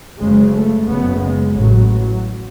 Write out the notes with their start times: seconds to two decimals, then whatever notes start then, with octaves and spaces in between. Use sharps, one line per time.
0.21 F#1 F#2 C#3 G#3
0.54 A3
0.88 F#1 F#2 C#3 B3
1.21 G#3
1.55 A1 F#3
1.60 A2
1.88 F#3